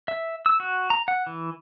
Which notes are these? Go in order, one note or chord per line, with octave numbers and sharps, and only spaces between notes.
E5
E6
F#4
A#5
F#5
E3